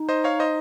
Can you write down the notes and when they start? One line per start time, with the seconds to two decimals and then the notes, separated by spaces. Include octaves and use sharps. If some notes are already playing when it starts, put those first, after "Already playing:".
Already playing: D#4
0.09 C5 D#5
0.24 C#5 F5
0.40 C5 D#5